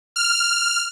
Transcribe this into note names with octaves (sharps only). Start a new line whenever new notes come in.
F6